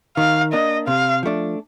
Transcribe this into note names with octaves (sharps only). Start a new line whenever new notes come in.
D#3 F5
A#3 D4 D#5
C3 F5
F3 A3 D4